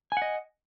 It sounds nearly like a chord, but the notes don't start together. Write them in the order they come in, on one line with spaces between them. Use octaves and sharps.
G#5 F#5 D#5